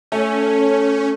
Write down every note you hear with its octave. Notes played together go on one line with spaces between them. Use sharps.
A3 C#4